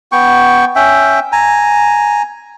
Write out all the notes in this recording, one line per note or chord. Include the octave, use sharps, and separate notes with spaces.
B3 G5 C#6
C#4 E5 G5
G#5 A#5